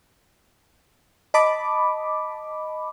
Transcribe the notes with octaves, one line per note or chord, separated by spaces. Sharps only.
D#5 A5 B5 D6